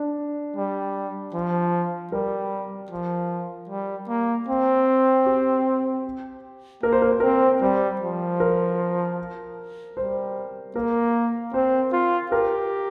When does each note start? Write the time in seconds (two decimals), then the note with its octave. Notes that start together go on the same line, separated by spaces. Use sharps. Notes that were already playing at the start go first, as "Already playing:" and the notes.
Already playing: D4
0.56 G3
1.34 F3
2.12 G3 A#4
2.90 F3
3.69 G3
4.09 A#3
4.48 C4
5.26 G4
6.83 A#3 A#4
6.92 C5
7.02 A#4
7.11 C5
7.20 C4 A#4
7.62 G3 C5
8.01 F3
8.40 A#4
9.97 G3 C5
10.76 A#3 A#4
11.54 C4 C5
11.92 F4
12.31 G4 A#4